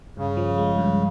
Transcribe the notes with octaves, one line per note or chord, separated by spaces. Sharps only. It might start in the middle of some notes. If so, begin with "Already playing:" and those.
G2 C#3
F3
G#3
G2